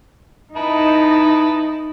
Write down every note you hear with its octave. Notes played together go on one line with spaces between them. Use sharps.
D#4 E4 B4 A5